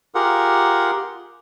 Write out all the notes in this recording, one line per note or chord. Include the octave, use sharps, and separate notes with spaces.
F4 G4 G#4 A#4 F#5